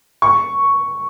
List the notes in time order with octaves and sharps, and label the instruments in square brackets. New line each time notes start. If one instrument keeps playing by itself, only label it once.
[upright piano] C#6